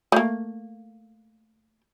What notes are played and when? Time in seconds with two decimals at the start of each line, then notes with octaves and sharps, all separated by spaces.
0.12 A3 A#3